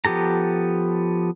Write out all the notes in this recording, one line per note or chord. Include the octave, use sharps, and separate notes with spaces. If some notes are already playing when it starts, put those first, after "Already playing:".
F3 B3 G4 A4 A#5